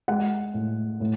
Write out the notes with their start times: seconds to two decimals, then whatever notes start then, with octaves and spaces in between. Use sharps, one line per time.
0.08 G#3 F#5
0.54 A2
1.00 A2